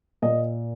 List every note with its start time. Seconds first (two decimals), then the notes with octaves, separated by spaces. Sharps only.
0.22 A#2 D#5